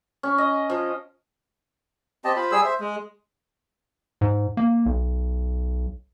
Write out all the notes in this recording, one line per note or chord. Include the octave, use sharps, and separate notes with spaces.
C#4
D#5
F3
C4 G4 D#5 A5
F4 C5 B5
G3 G#4 E6
C5 E5
G#3
G#2
A#3
B1